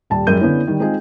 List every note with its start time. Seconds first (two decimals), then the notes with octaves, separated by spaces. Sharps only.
0.10 D#1 G3 A5
0.27 F#2 G3 G#3 A#4 G6 D#7
0.40 D3 B3 C#4 E4
0.67 D#3 G3
0.80 G#3 C4 D#4 F4 G#4